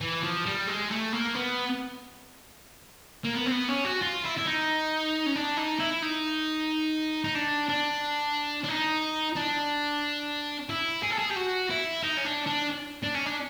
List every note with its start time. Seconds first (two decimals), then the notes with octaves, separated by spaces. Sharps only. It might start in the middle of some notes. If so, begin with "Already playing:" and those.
0.01 E3
0.23 F3
0.46 G3
0.67 G#3
0.91 A3
1.12 A#3
1.35 B3
3.25 A#3
3.34 B3
3.47 C4
3.52 B3
3.69 C#4
3.85 F#4
4.02 F4
4.25 E4
4.37 E4
4.46 D#4
5.26 C#4
5.36 D4
5.57 D#4
5.80 E4
6.03 D#4
7.24 D#4
7.35 D4
7.69 D4
8.64 D4
8.69 D#4
9.36 D4
10.70 E4
11.03 G#4
11.11 A4
11.19 G#4
11.30 G4
11.36 F#4
11.70 E4
12.03 D#4
12.17 C#4
12.25 D4
12.47 D4
13.03 D4
13.14 C#4
13.25 D4